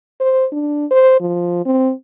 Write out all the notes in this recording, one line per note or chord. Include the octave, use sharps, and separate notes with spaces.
C5
D4
C5
F3
C4